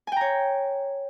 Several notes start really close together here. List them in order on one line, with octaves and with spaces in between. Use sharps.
G#5 G5 A#5 C#5